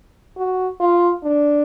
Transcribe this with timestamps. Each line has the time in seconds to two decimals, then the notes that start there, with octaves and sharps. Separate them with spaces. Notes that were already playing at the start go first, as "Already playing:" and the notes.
0.37 F#4
0.80 F4
1.23 D4